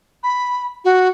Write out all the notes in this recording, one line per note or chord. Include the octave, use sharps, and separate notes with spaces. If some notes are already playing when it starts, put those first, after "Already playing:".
B5
F#4